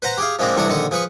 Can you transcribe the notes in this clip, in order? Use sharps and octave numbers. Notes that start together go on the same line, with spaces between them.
B4 C5 F#5 A#5
G4 G#4 F5
F3 G#3 A#3 C4 D4
A1 G2 C3 D4 C#6 D#6
A#1 D3 D#3 C#6 D#6
F3 G#4 B4 C#6